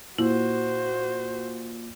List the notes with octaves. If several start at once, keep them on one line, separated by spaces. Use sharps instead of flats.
A#2 E4 F#4 C5